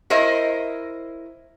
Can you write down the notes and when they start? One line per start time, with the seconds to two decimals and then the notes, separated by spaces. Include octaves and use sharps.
0.10 E4 A#4 C5 D#5 E5